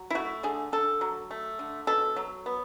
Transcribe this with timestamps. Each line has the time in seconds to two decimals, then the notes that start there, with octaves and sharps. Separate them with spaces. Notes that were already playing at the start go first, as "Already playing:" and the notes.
Already playing: F#3
0.10 E4
0.14 A3 F#4
0.43 D3 G#4
0.73 D3 A4
1.01 F#3
1.31 A3
1.59 D3
1.87 B2 A4
2.16 F#3
2.46 B3